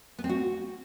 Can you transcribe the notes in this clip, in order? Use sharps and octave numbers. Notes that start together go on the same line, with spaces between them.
B3
C4
F#4